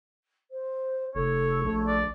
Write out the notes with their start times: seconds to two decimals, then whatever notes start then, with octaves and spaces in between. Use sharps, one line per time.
0.51 C5
1.15 F1 A4 C#5
1.64 A#1 A3
1.87 D5